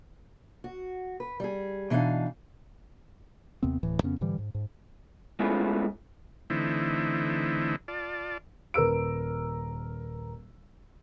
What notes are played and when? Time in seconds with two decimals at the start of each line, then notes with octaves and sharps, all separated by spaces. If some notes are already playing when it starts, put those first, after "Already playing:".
0.64 F#4
1.20 B4
1.40 G3 G#4
1.90 B2 E3 D4 D#4 F5
3.63 D#2 C3 B3 C4
3.83 D1 A2 E3
4.03 F2 C#3 B3 C#4
4.21 G#2 D3 E3 G3
4.38 G#2
4.55 G#2
5.39 G#3 A3 B3 C#4 E4 F4
6.50 D3 E3 A3 C4 D#4 E4
7.88 F4 D5 A5
8.74 D#1 A#4 B4 E6 D7